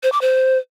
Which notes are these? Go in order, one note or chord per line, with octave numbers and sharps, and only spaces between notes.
C5
D6
C5